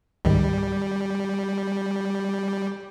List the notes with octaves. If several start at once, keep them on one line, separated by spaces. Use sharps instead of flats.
C#2 G#2 D#3 G3